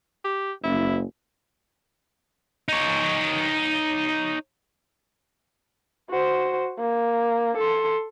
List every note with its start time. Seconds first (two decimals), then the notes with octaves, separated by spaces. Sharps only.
0.24 G4
0.64 F#1 E4
2.68 D#4 C#5
6.10 F#4 C5
6.79 A#3
7.57 A4 C6